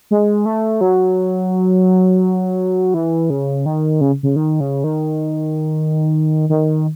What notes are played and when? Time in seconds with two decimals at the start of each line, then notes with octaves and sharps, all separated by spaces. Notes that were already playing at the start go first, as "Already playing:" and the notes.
0.11 G#3
0.46 A3
0.81 F#3
2.94 E3
3.30 C#3
3.66 D#3
4.01 C#3
4.23 C#3
4.36 D#3
4.60 C#3
4.84 D#3
6.50 D#3